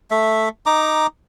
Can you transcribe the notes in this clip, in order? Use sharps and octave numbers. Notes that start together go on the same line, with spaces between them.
A3 E5
D#4 A#5 D6